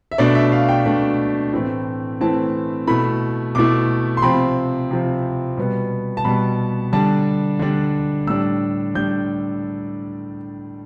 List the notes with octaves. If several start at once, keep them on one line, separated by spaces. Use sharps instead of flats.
E5
B2 A3 D4 D5
E5
F5
G5
B2 A3 D4
A2 E3 A3 C4 E4
A2 E3 A3 C4 E4 A5
B2 A3 E4 B5
B2 A3 E4 D6
C6
C3 F3 C4 B5
C3 F3 C4
B2 G3 B3
A5
B2 G3 B3 B5
D3 G3 D4 A5
D3 G3 D4
A2 G3 D4 E6
A2 G3 D4 G6